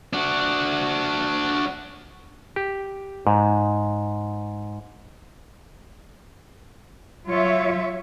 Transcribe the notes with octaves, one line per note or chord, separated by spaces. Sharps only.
D4 F#4
G4
G#2
F#3 F4 C#5 E5